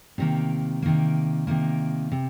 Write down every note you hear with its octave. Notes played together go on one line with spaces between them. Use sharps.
C3 D#3 A#3
C3 D#3 A#3
C3 D#3 A#3
C3